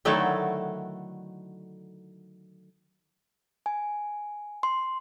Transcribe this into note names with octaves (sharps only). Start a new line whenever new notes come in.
D3 D#3 F#3 A3 E4
G#5
C6